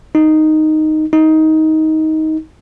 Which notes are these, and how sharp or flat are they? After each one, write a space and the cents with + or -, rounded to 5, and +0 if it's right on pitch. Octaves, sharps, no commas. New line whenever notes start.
D#4 -5
D#4 +15